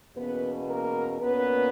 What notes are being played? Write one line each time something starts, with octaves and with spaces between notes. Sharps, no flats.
E2 B2 A#3 B3 C#4 B4
A#3 A#4
A#2 A#3 B3 C#4 B4